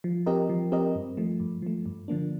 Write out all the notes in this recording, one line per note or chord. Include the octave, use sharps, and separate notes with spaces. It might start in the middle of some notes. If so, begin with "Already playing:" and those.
F3
C4 G4 A#4 D#5
F3
C4 G4 A#4 D#5
G2
F3 A3
G2
F3 A3
G2
D3 F3 A#3 D4